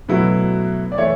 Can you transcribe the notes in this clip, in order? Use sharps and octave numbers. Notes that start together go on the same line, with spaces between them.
B2 F#3 A3 E4 B4
D5
E3 A3 C#5